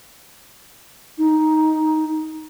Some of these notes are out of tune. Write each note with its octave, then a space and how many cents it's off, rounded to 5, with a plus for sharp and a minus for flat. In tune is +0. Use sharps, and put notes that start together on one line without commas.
D#4 +5